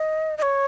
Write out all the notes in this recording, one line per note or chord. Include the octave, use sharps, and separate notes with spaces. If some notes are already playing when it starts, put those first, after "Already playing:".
Already playing: D#5
D#5
C#5